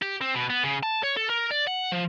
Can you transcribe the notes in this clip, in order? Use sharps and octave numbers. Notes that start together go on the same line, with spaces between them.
G4
C4
B2
B3
C#3
A5
C#5
A4
A#4
D5
F#5
F3